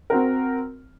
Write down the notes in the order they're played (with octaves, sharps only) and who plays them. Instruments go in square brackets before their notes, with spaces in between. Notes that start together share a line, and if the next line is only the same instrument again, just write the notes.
[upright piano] C4 F#4 A#4